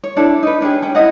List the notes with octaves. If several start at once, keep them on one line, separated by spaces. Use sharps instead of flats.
C#5
D4 E4 A4 D5
D#4 B4
C#4 D4 G4 G#4
C#4 G5
E4 D#5 F#5